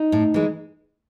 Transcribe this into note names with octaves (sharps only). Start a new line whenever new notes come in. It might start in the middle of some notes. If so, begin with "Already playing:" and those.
Already playing: D#4
A2
E3 G#3